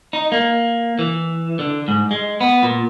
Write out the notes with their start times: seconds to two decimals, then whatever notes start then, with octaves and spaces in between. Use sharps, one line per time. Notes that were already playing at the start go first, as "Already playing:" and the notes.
0.13 D#4
0.32 A#3
0.99 E3
1.59 D3
1.88 G#2
2.11 G#3
2.41 B3
2.63 A#2